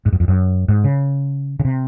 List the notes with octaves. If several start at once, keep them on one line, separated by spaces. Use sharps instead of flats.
G#2
F#2
F2
F#2
G#2
C#3
C#3
C3